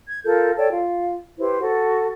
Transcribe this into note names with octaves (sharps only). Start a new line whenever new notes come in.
G#6
F4 A4 A#4 G6
A4 C#5 D5 G5
F4
E4 G4 B4 C5
F#4 A4